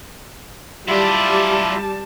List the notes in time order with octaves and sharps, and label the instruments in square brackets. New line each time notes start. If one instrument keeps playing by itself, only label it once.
[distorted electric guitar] F#3 D5 [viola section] G3 A5 [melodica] E4 F4 E5